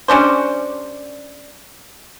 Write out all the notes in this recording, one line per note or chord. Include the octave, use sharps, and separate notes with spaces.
G3 C#4 D4 C5